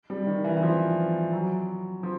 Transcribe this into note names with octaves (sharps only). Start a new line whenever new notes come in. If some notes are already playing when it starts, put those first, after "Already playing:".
G3
D#3
E3
E3
F3
F#3
F3